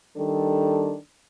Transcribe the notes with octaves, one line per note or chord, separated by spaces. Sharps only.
D#3 G3 D4 A4